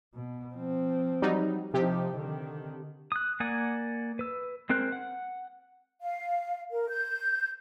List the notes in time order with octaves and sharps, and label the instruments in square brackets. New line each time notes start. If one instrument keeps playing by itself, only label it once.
[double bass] B2
F3 C4
[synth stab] F#3 G3 D#4
[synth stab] C3 G4 [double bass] F3 D#4
[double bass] D3 D#3
[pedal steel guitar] D#6 F#6
A#3 D5 F#5 G#5 D#6
B4 E6
G#3 C4 A#4 C5 F#6
F#5
[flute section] F5
A#4
G6